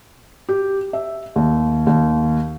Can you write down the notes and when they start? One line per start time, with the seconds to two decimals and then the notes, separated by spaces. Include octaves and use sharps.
0.49 G4
0.93 E5
1.36 D#2
1.87 D#2